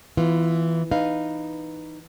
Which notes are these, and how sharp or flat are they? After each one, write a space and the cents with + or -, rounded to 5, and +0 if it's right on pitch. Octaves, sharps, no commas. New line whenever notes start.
E3 +0 B3 +0 F4 -15
D#4 -10 B4 +0 F5 +0